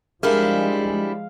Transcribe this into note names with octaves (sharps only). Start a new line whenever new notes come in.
F3 G3 G#3 D4 E4 G#4 A#4 F5